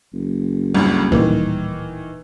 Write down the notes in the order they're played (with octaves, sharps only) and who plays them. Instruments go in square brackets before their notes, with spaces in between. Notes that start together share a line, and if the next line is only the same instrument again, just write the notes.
[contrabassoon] F#1
[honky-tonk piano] G1 D2 G2 [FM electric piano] G3
[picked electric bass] D1 A#2 A#3 [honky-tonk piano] D#3 E3